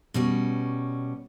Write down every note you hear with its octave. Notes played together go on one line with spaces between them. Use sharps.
B2 G3 C#4